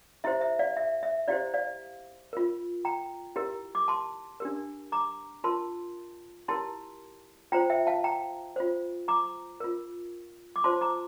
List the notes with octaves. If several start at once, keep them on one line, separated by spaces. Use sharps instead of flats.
E4 G4 C5 E5
E5
D5 F5
E5
E5
E4 G4 C5 D5 F5
D5 F5
F4 A#4
G5 A#5
E4 G4 A#4
D6
A5 C6
D4 G4 A#4
A#5 D6
F4 A#4 A5 C6
E4 G4 A#4 A5 C6
F4 C5 G5 A#5
E5 G5
F5 A5
G5 A#5
F4 C5
A#5 D6
F4 A#4
D6
F4 C5 A5 C6
A#5 D6